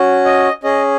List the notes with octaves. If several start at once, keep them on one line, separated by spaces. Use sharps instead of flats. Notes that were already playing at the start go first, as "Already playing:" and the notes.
Already playing: C#4 F#4
D#5
C#4 G#4 D#5